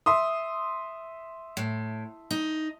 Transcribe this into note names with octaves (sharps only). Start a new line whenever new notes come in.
E5 C6 D#6
A2
D#4